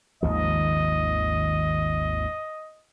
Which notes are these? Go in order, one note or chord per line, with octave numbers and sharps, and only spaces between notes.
G#1 D#2 F3 D#5